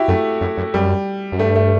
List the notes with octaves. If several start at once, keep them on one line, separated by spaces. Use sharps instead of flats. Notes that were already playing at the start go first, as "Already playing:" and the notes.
Already playing: E4 F#4 G4
F#2 A3
F#2
F#2
F#2 G3
F#2
G2 A3
A3